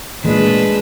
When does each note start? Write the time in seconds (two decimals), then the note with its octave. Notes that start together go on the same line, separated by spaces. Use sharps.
0.24 A#2 E3 G#3 A3 D4 B4